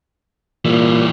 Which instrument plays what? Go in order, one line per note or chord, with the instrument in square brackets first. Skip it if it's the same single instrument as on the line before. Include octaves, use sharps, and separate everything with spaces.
[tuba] A#2 [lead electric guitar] E3 G3